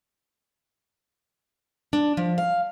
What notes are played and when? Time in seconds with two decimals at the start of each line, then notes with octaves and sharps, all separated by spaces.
1.93 D4
2.17 F3
2.38 F5